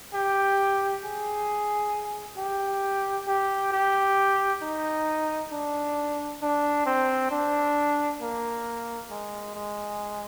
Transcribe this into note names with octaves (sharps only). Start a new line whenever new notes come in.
G4
G#4
G4
G4
G4
D#4
D4
D4
C4
D4
A#3
G#3
G#3